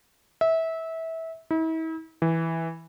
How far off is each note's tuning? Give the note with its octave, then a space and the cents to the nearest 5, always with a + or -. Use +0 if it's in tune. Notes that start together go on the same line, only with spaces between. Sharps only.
E5 -20
E4 -40
E3 -10